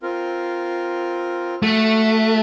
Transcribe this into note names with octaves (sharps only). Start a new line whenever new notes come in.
C4 F4 A#4
A3 F#4